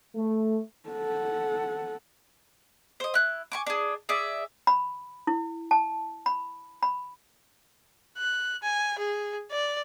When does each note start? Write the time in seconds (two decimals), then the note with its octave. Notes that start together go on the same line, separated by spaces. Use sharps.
0.16 A3
0.89 A4 F#5
3.00 C5 D#5
3.14 E4 F#6
3.52 G#5 C#6 D6
3.66 D4 G#4
4.09 G#4 D5 E5
4.67 B5
5.27 E4
5.71 A5
6.26 B5
6.83 B5
8.17 F#6
8.63 G#5
8.99 G#4
9.51 D5